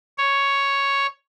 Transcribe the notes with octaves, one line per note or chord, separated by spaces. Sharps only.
C#5